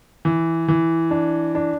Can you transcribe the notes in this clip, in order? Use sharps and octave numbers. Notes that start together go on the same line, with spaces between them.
E3
E3
D4
D4